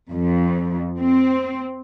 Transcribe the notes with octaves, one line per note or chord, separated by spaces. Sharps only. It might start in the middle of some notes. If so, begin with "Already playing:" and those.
F2
C4